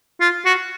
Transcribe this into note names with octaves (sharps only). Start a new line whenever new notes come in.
F4
F#4